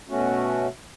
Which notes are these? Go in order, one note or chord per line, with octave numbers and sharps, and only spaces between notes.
B2 A3 C#4 F#4